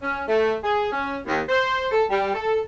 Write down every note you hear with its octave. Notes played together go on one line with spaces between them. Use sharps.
C#4
A3
G#4
C#4
D#2
C5
A4
G3
A4